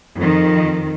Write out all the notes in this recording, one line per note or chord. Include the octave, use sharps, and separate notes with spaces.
F2 D#3